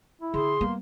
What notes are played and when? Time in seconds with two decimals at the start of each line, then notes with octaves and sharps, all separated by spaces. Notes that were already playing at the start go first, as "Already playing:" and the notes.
0.22 E4
0.34 D3 G#4 C6
0.61 G3 A#3 B3